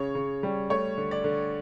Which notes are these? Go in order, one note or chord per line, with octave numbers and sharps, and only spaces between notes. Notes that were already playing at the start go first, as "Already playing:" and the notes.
Already playing: C#3 C#5
C#3
G3
A3 C#5
D3
D5
D3